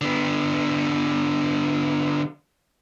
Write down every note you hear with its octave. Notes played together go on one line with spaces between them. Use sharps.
D3 B3